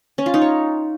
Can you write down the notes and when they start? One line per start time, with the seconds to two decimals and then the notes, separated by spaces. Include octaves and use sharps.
0.18 C#4
0.26 F4
0.34 D#4
0.42 C#5